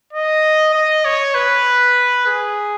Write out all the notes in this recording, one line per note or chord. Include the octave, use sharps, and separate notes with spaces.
D#5
D#5
C#5
B4
G#4